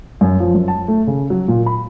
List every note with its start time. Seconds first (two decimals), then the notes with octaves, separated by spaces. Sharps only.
0.21 F#2
0.40 F3
0.54 F#2
0.68 A5
0.88 A3
1.07 C#3
1.30 F#3
1.48 A#2
1.66 B5